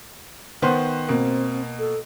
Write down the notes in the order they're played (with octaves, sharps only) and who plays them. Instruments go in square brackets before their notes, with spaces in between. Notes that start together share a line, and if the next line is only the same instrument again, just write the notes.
[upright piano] D#3 B3 C5
[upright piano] B2 A#3 [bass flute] C4
[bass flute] A4